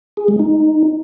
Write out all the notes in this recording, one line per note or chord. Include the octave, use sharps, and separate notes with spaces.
G#4
G#3
D#4